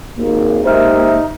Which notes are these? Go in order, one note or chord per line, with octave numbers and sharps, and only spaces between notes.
G#1 D#2 A#3
G#3 D#4 G4 C5 E5 F6